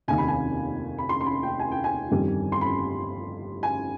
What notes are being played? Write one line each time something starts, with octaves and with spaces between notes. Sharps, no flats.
F1 D#2 D#3 G#5
B5
G#5
B5
C6
C6
B5
G5
G#5
G5
G#5
G1 F2 D#3 G3
C6
B5
G#5